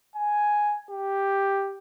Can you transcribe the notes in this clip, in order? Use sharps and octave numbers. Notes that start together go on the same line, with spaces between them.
G#5
G4